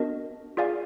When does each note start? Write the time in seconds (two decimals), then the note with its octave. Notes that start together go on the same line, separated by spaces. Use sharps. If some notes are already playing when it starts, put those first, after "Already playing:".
Already playing: B3 D4 F#4 A#4 D#5
0.57 F4 G#4 D5 F5 G#5